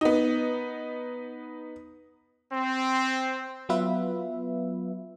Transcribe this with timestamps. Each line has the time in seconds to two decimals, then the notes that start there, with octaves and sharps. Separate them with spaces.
0.01 B3 D#4
2.52 C4
3.69 F#3 B3 F4 B4 E5